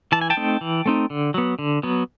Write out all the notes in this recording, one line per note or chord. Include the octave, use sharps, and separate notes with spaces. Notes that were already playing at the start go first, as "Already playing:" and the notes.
E3 A5
G#5
G5 A5
A3 C4 D#4
E3
A3 C4 D#4
D3
F#3 B3
D3
F#3 B3